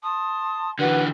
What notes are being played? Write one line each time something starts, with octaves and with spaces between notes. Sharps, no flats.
A5 C6 D#6
D3 E3 F#4 B4